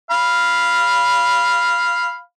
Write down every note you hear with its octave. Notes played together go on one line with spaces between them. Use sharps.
F5 B5